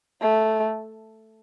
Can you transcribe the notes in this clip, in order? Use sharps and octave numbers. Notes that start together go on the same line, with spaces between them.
A3